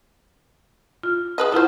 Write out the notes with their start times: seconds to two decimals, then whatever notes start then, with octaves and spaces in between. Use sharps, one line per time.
1.03 F4
1.38 G#4 B4 D#5
1.52 E4 F4 A4 C5 F#5